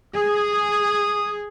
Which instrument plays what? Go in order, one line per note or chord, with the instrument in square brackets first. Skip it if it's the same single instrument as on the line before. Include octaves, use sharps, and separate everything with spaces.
[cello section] G#4 [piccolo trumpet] D#6